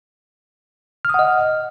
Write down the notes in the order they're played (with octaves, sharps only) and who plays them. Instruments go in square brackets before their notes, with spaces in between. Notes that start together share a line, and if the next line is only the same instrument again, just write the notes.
[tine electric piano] F6
D#6
F#5
D#5